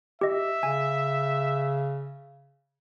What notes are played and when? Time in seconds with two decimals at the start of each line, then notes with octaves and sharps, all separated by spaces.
0.21 G4 D#5 E5
0.63 C#3 G#5